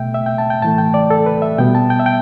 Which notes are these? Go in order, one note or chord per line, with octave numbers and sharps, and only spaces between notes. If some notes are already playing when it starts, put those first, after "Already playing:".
Already playing: B2 A3 E5 G5
E5
G5
A5
G5
A2 E3 A3 A5
G5
D5
A4
B4
E5
B2 G3 B3 G5
A5
G5
E5
G5